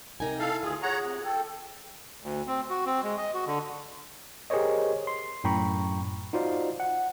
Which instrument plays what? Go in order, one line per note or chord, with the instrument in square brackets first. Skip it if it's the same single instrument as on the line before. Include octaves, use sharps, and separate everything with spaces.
[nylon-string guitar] C3 D#4 G#5 [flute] A#4
[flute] E4 [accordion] A4 F5
[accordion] D2 G#4 [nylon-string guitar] F4
[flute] G#4 [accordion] C#5 F#5 A#5
[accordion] C3
[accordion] A4 [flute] G5
[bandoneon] D2
C4
F#4
C4
G#3
D#5
F#4
D3
[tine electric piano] G4 G#4 A#4 C5 C#5 D#5
C6
F#2 A2 G5 A#5 B5 C#6
D#4 F4 F#4 C5 D5 F5
F#5